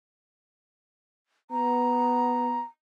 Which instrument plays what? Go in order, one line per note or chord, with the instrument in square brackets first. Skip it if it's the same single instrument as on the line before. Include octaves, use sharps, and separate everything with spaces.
[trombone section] B3 [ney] A#5